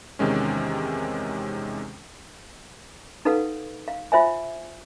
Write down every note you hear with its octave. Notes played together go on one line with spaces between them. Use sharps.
E2 C3 D#3 G#3 C#4
D#4 A4 B4 F5 F#5
F5
F4 C5 E5 G#5